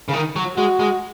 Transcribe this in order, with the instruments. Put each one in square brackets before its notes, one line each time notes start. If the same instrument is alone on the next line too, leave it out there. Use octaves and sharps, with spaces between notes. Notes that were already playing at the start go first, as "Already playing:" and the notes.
[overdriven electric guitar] C#3
D#3
F#3
[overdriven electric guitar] G#3 [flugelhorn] F#4
[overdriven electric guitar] G#3